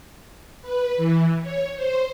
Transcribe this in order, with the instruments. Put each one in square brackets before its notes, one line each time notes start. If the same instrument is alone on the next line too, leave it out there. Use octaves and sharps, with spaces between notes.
[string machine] B4
E3
C#5
C5